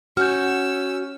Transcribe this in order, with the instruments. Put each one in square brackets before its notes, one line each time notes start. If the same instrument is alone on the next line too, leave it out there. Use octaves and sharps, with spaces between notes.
[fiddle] C#4 E6 [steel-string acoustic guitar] F#4 G#5 [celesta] F6 G6